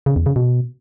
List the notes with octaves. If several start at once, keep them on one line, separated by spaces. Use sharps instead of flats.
C#3
E2
C#3
B2